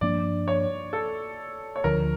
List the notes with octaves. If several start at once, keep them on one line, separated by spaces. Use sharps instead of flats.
G2 F3 A#3 D4 D5
C#5
A4
C#5
D2 D3 F3 A#4